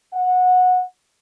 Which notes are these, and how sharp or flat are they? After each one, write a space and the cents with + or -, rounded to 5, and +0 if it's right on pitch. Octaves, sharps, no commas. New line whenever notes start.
F#5 -20